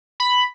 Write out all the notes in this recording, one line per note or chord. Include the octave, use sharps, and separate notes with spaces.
B5